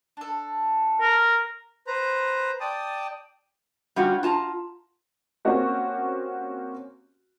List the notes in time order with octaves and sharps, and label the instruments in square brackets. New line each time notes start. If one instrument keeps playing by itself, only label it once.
[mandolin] D4 A4
[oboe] A#4
[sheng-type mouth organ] B4 C5 A#5
D5 G5 A5 D#6
[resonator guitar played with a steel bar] G3 C#4 F4 F#4
F4 A5 A#5
[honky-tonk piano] A#3 C4 C#4 F#4 G4